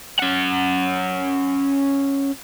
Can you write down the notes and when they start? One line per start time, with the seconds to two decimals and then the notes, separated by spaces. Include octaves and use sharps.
0.19 C#4 F#5